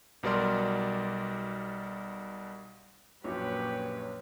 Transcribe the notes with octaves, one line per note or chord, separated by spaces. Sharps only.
B1 B2 G3 A#4 D5 C6
A#1 F#2 A#2 G4 B4 C#5